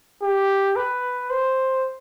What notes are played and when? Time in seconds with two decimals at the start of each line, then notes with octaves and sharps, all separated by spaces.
0.23 G4
0.76 B4
1.30 C5